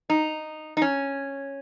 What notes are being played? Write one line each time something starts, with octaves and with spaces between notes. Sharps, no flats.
D#4
D#4
C#4